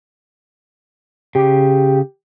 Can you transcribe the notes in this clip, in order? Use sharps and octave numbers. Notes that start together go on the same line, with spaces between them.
C#3 G4